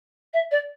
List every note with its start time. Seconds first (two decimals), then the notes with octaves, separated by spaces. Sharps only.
0.33 E5
0.51 D5